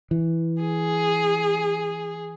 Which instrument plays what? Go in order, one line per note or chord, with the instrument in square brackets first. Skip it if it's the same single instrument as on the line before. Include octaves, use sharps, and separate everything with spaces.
[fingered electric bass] E3
[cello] G#4